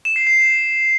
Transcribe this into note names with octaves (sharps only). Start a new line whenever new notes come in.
E7
C7
C7